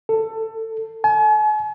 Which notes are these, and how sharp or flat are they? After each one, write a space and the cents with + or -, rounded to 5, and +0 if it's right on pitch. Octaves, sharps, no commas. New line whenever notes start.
A4 +20
G#5 +45